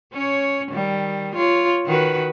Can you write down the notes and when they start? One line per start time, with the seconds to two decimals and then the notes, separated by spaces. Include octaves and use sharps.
0.13 C#4 C#5
0.72 D#3 G3
1.35 F4 C#5
1.86 D#3 F#4 B4